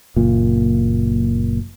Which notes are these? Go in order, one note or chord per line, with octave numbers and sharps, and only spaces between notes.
F#1 A#2